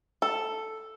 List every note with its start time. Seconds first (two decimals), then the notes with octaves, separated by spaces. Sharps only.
0.22 A4